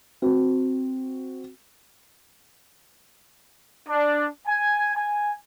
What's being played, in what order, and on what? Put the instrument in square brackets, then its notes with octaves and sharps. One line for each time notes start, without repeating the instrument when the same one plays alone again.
[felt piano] C4 F#4
[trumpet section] D4
G#5
G#5